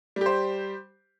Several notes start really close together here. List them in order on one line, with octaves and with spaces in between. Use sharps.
G3 G4 C5